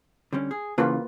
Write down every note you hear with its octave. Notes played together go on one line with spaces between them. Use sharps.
D3 G3 C#4
G#4
C#3 E3 A#3 F4 B4